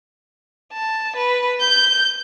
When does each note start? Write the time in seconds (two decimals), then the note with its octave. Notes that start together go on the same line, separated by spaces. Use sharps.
0.72 A5
1.17 B4
1.60 G6